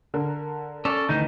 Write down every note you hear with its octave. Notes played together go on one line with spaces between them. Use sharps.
D3 A#4
C#4 A4 D5
D2 D#3 E3 D#4